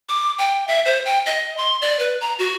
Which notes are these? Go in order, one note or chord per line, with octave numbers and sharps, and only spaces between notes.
D6
G5
E5
C5
G5
D#5
C6
D5
B4
A#5
F#4